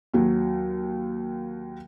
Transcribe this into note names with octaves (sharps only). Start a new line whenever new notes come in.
D#2 F#3